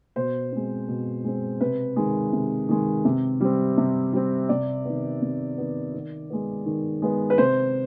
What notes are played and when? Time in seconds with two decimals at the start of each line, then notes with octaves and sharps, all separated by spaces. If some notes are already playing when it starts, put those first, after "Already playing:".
0.16 B2 C5
0.52 G#3 C4
0.88 B2
1.24 G#3 C4
1.61 C3 B4
1.96 D#3 G#3
2.33 C3
2.69 D#3 G#3
3.05 C3
3.40 G3 C4
3.77 C3
4.13 G3 C4
4.49 C3 D5
4.85 D#3 B3
5.22 C3
5.58 D#3 B3
5.94 D#3
6.30 G#3 B3
6.66 D#3
7.02 G#3 B3
7.30 B4
7.38 C3 C5